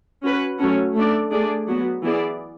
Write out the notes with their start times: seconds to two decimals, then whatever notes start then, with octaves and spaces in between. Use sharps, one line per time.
0.22 C#4 F#4 B4
0.58 F#3 A3 C#4 F#4 A4
0.94 A3 D4 A4 D5
1.31 A3 D4 G#4 D5
1.67 F#3 B3 F#4
2.03 E3 B3 E4 G#4 D5